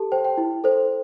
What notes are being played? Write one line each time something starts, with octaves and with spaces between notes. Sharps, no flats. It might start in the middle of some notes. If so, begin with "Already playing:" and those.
Already playing: G4 A4 A5
C5 G5
G5
E4
A4 C5